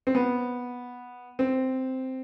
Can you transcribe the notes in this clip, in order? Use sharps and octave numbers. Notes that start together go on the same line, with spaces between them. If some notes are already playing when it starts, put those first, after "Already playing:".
C4
B3
C4